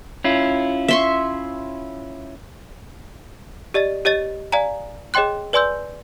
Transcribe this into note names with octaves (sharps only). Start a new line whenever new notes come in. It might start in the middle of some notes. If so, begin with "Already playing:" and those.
C#4 E4 F4
E5 C6 C#6
G4 D5 D#5 A6
G4 C#5 D#5 A6 D#7
D5 F5 G#5 A#5
G#4 C#5 D#5 G5 C6 F#6
B4 D5 G#5 C6 E6 G6